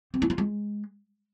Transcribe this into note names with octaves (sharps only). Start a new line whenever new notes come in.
C4
E4
F4
G#3